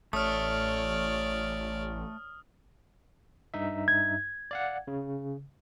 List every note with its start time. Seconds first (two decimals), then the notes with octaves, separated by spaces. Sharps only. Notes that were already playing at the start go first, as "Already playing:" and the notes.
0.13 A1 A3 C#5 D5 D#6 F6
3.54 G2 D#4 E5
3.88 G#6
4.51 D5 F5 F#5
4.87 C#3